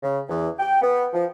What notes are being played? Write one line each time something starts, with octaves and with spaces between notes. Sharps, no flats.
C#3
E2
G5
B3
F3